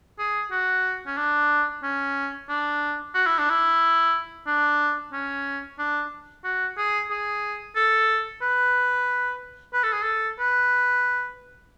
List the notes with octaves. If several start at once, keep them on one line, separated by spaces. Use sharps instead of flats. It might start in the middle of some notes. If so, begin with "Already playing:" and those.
G#4
F#4
C#4
D4
C#4
D4
F#4
E4
D4
E4
D4
C#4
D4
F#4
G#4
G#4
A4
B4
B4
A4
G#4
A4
B4